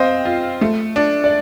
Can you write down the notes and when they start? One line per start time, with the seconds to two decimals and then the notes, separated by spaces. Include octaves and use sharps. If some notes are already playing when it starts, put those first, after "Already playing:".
Already playing: C4 C5 D#5 F5
0.25 F4
0.61 A3
0.96 D4
1.24 D5